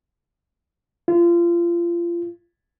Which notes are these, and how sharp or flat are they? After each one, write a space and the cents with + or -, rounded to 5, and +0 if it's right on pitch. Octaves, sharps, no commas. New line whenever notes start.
F4 -30